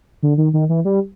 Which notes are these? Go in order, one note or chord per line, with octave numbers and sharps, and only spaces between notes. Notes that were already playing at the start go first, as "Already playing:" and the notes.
D3
D#3
D#3
E3
G3